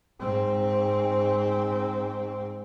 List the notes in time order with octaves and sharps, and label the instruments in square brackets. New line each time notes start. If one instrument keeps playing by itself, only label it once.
[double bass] G#2 C4